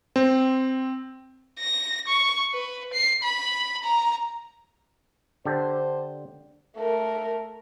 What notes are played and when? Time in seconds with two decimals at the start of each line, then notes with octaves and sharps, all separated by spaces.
0.16 C4
1.60 A#6
2.08 C#6
2.54 B4
2.94 C7
3.23 B5
3.83 A#5
5.45 D3 G4 A4 C5
6.77 A3 A#4